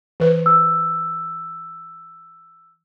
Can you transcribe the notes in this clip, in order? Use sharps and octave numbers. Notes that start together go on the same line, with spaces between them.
E3 B4
E6